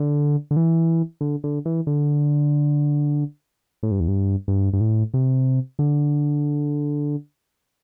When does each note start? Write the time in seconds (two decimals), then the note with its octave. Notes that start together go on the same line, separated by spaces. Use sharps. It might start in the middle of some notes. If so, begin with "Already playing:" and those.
Already playing: D3
0.51 D3
0.56 E3
1.21 D3
1.44 D3
1.66 E3
1.87 D3
3.83 A2
3.91 G2
4.00 E2
4.08 G2
4.48 G2
4.73 G2
4.81 A2
5.14 C3
5.79 D3